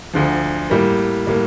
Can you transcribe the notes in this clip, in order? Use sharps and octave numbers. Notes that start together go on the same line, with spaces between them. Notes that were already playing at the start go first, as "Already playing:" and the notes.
D2 D3 F3
A2 G3 A#3
A2 G3 A#3